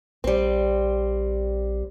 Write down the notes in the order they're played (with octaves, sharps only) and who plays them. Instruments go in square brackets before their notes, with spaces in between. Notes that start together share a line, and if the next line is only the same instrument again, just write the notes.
[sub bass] A#1 [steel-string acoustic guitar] G3 C4